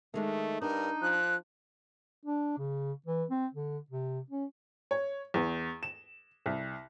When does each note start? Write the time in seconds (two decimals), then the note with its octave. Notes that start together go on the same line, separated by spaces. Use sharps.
0.14 D#3 G#3 A3 D4
0.62 G2 D4 D#4 A#4
1.02 F3 F#6
2.25 D4
2.58 C#3
3.06 E3
3.30 C4
3.54 D3
3.90 C3
4.30 C#4
4.91 C#5
5.34 E2
5.83 E7
6.46 C2